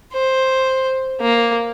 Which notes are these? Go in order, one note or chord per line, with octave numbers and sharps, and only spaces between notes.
C5
A#3